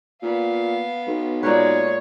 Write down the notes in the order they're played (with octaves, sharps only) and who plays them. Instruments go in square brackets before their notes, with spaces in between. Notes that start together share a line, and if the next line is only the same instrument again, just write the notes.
[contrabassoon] A#2 [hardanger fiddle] B3 F5
[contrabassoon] B1
[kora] A#2 A#4 B4 [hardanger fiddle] G#3 [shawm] C#5